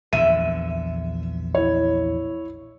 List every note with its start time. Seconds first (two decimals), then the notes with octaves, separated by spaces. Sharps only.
0.13 A#1 E2 D3 E5 D#7
1.55 E4 C#5